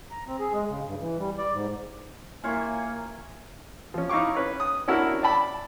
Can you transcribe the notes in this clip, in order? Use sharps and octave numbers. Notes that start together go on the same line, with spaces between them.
A#5
C4
G#4
G#3
C#3
G2
E3
G3
D5
G#2
A#3 E4 F4 G4 C#5 E5 G#5
F3 C#4
D#4 E4 F5 C#6 D6
C#4 B4 C#5
D#6
C#4 D4 E4 F#4 A#4
D5 G5 A5 B5